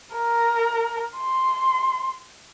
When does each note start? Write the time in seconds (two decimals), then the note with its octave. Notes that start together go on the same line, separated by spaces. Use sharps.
0.14 A#4
1.18 C6